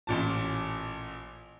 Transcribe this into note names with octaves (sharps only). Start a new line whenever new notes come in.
A1 A#2 A5